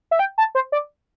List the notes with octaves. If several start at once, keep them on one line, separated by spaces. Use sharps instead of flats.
E5
G5
A5
C5
D5